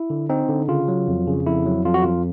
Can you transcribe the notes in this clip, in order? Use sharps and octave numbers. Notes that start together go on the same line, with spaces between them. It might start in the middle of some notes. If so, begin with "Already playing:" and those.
Already playing: E4
D3
C4 D#4
D3
C#3 F4
F#3
F2
C#3
F2 E4
F#3
F2 F4
F#4
F2 F4